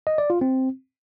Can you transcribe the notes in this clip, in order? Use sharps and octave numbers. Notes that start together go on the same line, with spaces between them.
D#5
D5
F4
C4